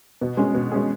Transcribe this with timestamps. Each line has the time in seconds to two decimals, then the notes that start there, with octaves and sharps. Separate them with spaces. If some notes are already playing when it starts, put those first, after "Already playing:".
0.21 B2
0.37 G#3 C#4 G#4
0.54 B2
0.72 G#3 C#4 G#4